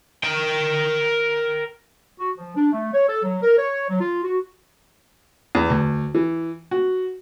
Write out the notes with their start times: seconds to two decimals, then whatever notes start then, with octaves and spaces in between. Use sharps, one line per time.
0.24 A#4 G5
2.19 F#4
2.37 F3
2.56 D4
2.72 A3
2.93 C#5
3.08 A4
3.23 F#3
3.42 A#4
3.58 C#5
3.89 F#3
4.01 F4
4.24 F#4
5.55 E2
5.70 D2
6.14 E3
6.71 F#4